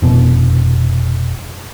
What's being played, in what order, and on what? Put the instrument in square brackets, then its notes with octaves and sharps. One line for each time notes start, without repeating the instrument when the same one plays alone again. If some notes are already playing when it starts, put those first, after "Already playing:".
[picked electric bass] F1 B2